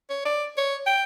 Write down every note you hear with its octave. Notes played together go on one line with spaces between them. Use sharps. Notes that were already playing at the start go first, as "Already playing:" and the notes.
C#5
D5
C#5
G5